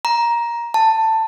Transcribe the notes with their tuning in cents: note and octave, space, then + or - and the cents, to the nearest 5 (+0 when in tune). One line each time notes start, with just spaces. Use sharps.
A#5 +15
A5 +15